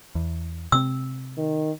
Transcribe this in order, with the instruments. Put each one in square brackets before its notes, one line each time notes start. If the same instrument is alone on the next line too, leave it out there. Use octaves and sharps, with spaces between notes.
[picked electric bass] E2
[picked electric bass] C3 C4 [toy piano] E6
[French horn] D#3